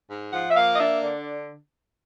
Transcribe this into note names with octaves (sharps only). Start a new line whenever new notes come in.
G#2
F3 F#5
E5
A#3 F5
D#5
D4 E5
D3